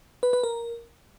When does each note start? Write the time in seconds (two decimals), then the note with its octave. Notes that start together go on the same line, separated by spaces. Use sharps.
0.23 B4
0.33 B4
0.43 A#4